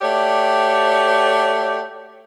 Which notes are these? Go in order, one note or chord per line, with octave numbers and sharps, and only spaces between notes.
A3 F#4 G4 C#5 D5